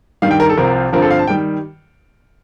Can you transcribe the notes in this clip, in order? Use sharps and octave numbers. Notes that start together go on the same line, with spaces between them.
G2 D#3 G3 F5
G5
A#4
A4
C2 C3 F3 C4 F4 A#4
G2 D3 F3 C4 F4 A#4
A4
F5
A5
D#3 G3 G5